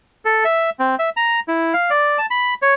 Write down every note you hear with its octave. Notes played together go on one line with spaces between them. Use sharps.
A4
E5
C4
E5
A#5
E4
F5
D5
A5
B5
C#5